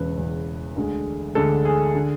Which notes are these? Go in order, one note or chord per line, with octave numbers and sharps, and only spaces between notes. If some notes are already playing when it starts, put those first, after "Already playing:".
Already playing: E1 E2 C#3 B4
E1 E2 C#3
D2 D3 G#3
D2 D3 G#3 A4
G#4
D3